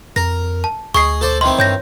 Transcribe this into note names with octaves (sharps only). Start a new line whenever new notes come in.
F2 A#4 A#6
A5
D2 G#4 D#5 C#6 C7
A4 C5 D5
D#3 E3 C4 C6
G2 C#5 G6 A#6